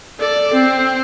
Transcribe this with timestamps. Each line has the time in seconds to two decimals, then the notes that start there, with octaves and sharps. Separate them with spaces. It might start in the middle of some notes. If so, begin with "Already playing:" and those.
0.20 A4 D5
0.53 C4